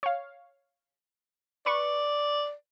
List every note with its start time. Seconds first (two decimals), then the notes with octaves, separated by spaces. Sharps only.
0.03 C#5 F5
1.66 B4 D5 C#6